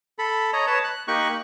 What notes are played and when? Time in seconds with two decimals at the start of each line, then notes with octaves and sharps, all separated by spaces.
0.19 A4 B5
0.53 C#5 D#5 A#5
0.67 B4 C#5 A5
0.84 F#6
1.08 A#3 D#4 G4 C#6 F#6